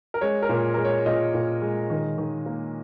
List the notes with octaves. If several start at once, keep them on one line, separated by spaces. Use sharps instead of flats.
A#4
G#3 C#5
A#4
A#2
G#3 A#4
C#5
A#2 D#5
A#2
G#3
D#3
D#3
A#3